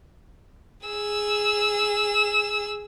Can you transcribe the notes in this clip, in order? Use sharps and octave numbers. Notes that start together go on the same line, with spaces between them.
G#4 E6